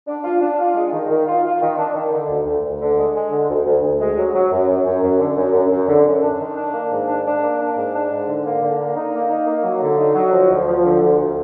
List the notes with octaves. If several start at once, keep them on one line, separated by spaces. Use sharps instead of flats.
D4
F4
D4
F4
G#3
D#3
D#3
F4
F4
D#3
D4
D#3
D3
D2
D2
D2
D3
G#3
G#3
D3
D2
D2
D2
G#3
F#3
F#3
F#2
F#2
F#2
F#2
D3
F#2
F#2
F#2
D3
F#2
D4
D#3
D4
A#3
G#2
D4
D4
A#3
D4
G#2
D4
G#2
D3
A#3
D3
A#3
D#4
A#3
D#4
A#3
F#3
D3
D#4
F#3
F3
D2
F3
D3
D2
D2